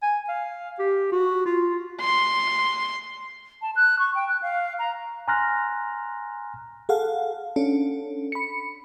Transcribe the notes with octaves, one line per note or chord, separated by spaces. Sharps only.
G#5
F5
G4
F#4
F4
C6
A5
F#6
C#6
G5
F#6
F5
A#5
G#5 A#5 C6 F6 F#6 A#6
G#4 A4 F5 F#5
C#4 D4 A4
B5 C#7